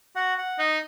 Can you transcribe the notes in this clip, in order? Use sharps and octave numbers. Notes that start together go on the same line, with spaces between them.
F#4 F#5
F#5
D#4 D#5